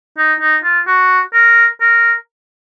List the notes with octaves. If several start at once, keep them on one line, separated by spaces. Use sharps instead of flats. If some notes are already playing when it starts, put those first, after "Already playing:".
D#4
D#4
F4
F#4
A#4
A#4